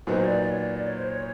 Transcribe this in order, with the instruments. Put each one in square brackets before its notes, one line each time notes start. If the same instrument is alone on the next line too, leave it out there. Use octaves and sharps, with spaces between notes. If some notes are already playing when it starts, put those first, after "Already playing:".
[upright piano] A#2 F#3 B3 D#4 [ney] C5
[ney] D5
D5
C#5
D5
D5
C#5
C5
C#5